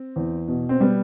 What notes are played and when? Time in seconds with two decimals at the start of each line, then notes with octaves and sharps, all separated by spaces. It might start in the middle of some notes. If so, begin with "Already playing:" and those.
Already playing: C4
0.16 E2
0.48 B2
0.69 C4
0.80 G3 B3